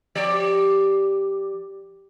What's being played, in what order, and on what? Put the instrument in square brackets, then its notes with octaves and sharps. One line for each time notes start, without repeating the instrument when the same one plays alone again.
[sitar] F3 G4 D5